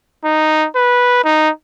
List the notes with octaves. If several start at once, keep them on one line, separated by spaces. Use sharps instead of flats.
D#4
B4
D#4